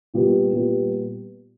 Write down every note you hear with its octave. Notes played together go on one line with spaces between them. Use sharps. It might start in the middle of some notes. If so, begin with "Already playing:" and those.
A#2 G3 B3
A#2 G3 B3